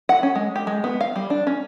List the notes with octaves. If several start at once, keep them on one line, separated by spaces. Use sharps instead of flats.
F#5
C#4
G#3
G4
G#3
B3
F5
G3
D4
C#4